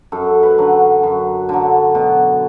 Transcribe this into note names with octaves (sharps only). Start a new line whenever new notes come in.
F#2 A4
B4
D3 F#3
F#2
D3 F#3
B2